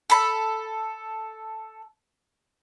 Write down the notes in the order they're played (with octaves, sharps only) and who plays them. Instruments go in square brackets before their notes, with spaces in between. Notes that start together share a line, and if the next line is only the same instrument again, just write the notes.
[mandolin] A4 B5